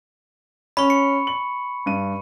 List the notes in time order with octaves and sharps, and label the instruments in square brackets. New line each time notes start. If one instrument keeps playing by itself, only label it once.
[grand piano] C#4 [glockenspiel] B5 C#6
[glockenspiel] C#7
[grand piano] F#7
G2 D#7